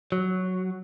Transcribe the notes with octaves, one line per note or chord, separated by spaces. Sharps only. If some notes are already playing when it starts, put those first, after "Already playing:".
F#3